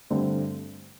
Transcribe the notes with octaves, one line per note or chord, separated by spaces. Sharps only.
G2 D3 A3 C4